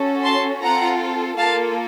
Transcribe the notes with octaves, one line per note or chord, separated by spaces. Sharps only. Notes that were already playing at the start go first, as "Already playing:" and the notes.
Already playing: C#4 F#4 A4
A5 C6
C4 F4 A4 F#5 A#5
A#3 F4 A4 F5 A5